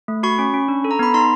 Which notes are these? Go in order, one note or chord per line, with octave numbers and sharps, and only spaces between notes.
A3
F#4 B5 C#6
C#4
C#4
D4
A4
A#5
B3 B5
D#4 A#5 C6